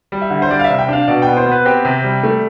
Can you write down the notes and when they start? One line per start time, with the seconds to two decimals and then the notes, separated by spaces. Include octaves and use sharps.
0.12 G3
0.22 E5
0.30 D3
0.42 C5
0.51 G3 D5
0.59 F5
0.64 E5
0.70 C3
0.79 G5
0.89 D4 F5
1.08 B2 D5
1.22 B3 G5
1.37 C5
1.46 B3
1.51 B4
1.65 C4 G4
1.85 C3
2.04 G3
2.23 A3